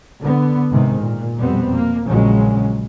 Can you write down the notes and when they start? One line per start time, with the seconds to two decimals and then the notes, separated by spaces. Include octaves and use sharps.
0.20 D3 B3
0.71 G#2 C3 D#3
1.01 A#2
1.38 F2 B2 G3 B3 C4
1.75 A#3
2.06 A#1 A#2 C#3 F#3 G#3 C#4